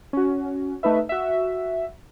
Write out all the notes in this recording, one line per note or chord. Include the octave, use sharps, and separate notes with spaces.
C#4 F#4
A3 D#4 B4 E5
F#4 E5